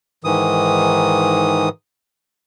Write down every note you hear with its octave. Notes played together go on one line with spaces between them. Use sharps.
G#2 D#3 E3 D#6